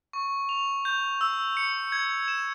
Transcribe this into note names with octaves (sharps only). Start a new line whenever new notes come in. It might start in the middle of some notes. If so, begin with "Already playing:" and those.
C#6
F7
G6
E6
C#7
G#6
E7